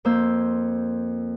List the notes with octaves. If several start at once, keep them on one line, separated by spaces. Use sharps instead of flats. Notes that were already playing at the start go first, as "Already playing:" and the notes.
F2 A#3 C5 E6